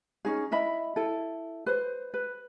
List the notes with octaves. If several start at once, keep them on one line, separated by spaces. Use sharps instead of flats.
C#4 D#4 G#4
E4 D#5 E5 B5
E4 A4
B4 C5
B4